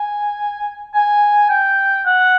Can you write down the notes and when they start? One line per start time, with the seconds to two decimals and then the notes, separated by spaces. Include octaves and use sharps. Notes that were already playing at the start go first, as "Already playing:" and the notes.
Already playing: G#5
0.94 G#5
1.49 G5
2.06 F#5